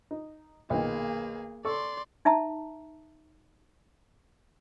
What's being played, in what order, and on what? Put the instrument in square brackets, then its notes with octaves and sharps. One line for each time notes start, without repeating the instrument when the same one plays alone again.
[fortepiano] D#4
[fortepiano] B1 A#2 D#3 [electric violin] A#3 G#4
[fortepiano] A4 C#6 [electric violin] D5 C6
[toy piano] D#4 E5 A5 A#5